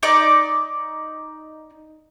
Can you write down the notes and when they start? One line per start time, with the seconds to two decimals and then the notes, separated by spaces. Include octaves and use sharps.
0.03 D#4 D5 D6